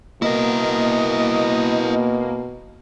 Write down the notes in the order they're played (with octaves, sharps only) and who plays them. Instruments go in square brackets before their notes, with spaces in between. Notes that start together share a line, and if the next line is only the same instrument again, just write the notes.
[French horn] B2 [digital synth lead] A#3 [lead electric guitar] E4 A#4 [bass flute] D#5